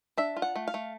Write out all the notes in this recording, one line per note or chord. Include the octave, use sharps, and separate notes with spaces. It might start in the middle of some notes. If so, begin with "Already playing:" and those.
D4 E5
F4
F#5
A3
F5
A3